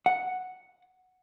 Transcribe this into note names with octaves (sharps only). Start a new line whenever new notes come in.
F#5